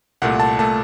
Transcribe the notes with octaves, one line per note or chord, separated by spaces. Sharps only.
C2 A#2 A3 F#5
A5
A#2 A3 A5